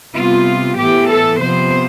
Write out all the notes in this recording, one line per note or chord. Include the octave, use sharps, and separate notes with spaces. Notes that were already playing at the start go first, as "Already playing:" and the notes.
C3 G3 B3 F4
A2 E3 B3 G4
A4
C3 F3 B3 C5